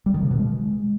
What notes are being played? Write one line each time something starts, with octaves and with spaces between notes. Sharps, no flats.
G3
D#3
C#3
B2
G#3